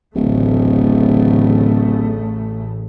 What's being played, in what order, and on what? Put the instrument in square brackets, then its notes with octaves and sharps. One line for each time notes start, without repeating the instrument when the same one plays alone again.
[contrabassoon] D1 [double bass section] A1 C#3 A3